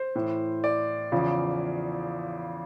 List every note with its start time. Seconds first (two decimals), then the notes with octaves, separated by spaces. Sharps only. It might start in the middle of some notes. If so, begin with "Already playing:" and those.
Already playing: C5
0.15 A2 E3
0.64 D5
1.12 E2 C#3 F3